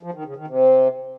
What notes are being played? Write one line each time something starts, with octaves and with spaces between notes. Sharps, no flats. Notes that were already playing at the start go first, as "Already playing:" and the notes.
F3
D#3
C#3
D#3
C3